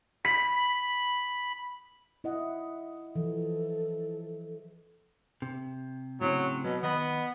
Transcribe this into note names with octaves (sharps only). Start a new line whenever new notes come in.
B5 B6
E4 D#5 F#5
E3 F3 A4
C3
A2 C#3 F#3 C4
B2 F#3
D#3 B3 D#5 B5